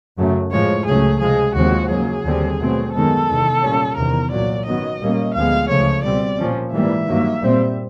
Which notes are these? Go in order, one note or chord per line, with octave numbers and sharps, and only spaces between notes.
F#2 C#3 F#3 A3
A2 F3 G#3 C#5
C#2 C#3 F#3 A3 C#4 G#4
C3 F3 G#3 G#4
D#2 C#3 F3 G#3 C4 F#4
F#2 C#3 F#3 A#3 G#4
D#2 D3 G3 C4
B2 F#3 A3 C4
F#2 D#3 G#3 B3 A4
E2 C3 D#3
A#2 G3 A#3 C#4
E2 C3 D#3 A#4
C2 A#2 F#3 D5
F#2 D#3 F#3 B3 D#5
A#2 G3 A#3 C#4
D2 D3 F3 G#3 B3 F5
C#2 C#3 F3 A3 C#5
B2 G3 C4 D5
A#2 F3 A#3 C#4
G#2 E3 G3 A#3 E5
G2 D#3 F#3 A#3
A#2 G3 C4